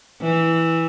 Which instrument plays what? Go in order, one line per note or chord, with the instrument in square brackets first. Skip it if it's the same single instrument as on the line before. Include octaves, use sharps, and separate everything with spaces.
[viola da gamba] E3